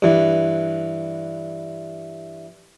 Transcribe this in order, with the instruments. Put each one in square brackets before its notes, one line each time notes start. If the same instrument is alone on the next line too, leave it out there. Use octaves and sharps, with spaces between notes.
[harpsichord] G2 E3